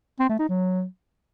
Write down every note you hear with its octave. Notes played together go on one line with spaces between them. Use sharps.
C4
A3
D#4
F#3